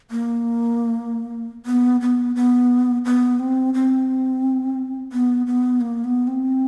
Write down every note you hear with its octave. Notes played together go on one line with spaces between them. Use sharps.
A#3
B3
B3
B3
B3
C4
C4
B3
B3
A#3
B3
C4